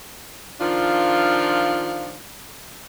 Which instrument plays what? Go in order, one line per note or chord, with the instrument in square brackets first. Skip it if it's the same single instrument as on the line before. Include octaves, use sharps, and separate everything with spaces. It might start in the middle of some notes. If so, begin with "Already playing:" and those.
[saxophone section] D#3 F3 D4 F4